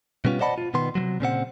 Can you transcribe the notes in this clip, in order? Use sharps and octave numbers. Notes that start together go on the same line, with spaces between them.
B2 G3 B3 C#4 F4
C5 D5 D#5 F#5 A5 B5
F4
B2 D#3 B3 C6
C3 F3 F#3
A#2 C#3 C4 F#5